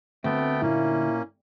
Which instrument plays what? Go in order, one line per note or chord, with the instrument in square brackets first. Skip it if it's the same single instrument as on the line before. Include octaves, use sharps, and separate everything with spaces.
[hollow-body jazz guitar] D2 [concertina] A3 B3 G5 [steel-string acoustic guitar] C4
[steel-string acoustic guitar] A#2 [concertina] A#3 C#4 [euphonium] E4